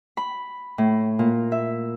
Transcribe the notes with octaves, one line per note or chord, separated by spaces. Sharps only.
B5
A2
A#2
E5